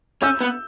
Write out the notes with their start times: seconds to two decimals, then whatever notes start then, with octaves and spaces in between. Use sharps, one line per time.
0.22 C#4 E6 G6
0.41 B3